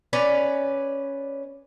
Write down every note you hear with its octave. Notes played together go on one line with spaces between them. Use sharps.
C#4 B4 D5